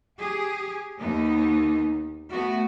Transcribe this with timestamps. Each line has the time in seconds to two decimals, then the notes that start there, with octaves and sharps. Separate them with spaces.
0.19 G4 G#4
0.99 D#2 B3 D#4
2.31 A3 B3 F#4